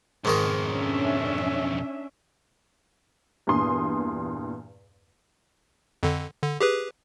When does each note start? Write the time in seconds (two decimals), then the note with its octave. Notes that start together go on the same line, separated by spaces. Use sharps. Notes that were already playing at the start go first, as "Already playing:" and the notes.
0.25 B1 F2 G#2 D#3 A#4
0.66 C#4 D4 E5
3.47 E2 G2 A#2 G#5 C6 D#6
6.03 F2 D3
6.42 D3
6.61 G4 G#4 B4